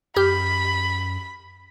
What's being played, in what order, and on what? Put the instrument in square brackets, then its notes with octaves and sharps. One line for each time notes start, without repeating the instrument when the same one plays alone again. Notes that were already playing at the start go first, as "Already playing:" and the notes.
[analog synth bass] F#2 [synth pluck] G4 F6 G6 [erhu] B5